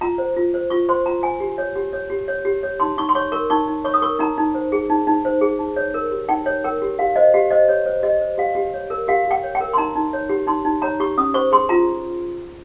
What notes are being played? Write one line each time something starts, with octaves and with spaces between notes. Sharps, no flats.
F4 A#5
C5
F4
C5
F4 C#6
C5 C6
F4 A#5
C5 G#5
G4
C#5
G4
C#5
G4
C#5
G4
C#5
D#4 C6
D#4 C#6
C6
C#5 C#6
A#4 C#6
D#4 C#6
D#4
C#5 C#6
D#6
A#4 C#6
D#4 A#5
D#4
C5
G#4
D#4
D#4
C5
G#4
D#4
C#5
A#4
G4
D#4 G5
C#5
A#4 G5
G4
G4 F5
C5 D#5
G4 F5
C5 D#5
G4 C#5
C5
G4 D#5
C5
G4 F5
G4
C#5
A#4
G4 F5
G4
G5
C#5
G5
A#4
C6
D#4 A#5
D#4
C#5
G4
D#4 C6
D#4
C#5 A#5
G4 C#6
C#4 D#6
C5 C#6
G#4 C6
F4 A#5